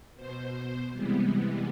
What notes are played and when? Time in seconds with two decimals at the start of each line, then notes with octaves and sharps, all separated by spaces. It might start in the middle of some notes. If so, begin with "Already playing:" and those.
0.14 B2 C5
0.93 C3 E3 G3 G#3 B3